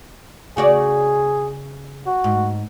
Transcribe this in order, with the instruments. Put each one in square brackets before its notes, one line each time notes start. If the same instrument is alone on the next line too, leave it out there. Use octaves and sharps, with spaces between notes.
[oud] C#3 F#4 D5 [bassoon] G#4
[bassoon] F#4
[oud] G#2